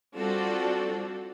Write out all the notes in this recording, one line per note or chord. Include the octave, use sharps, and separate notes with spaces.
G3 C4 D4 F4 F#4 A4